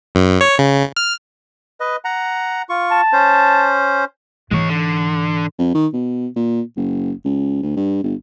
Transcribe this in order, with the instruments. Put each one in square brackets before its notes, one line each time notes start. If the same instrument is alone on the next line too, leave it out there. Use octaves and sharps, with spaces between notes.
[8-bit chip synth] F#2
C#5
C#3
F6
[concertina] B4 D#5
F#5 A#5
F4 C#6
[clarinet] A5
[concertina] C#4 C5
[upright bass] G#2 E3 [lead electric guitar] G#3 C#5
[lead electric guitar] D3
[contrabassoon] F2
D#3
B2
A#2
F#1
C#2
D2
G2
G1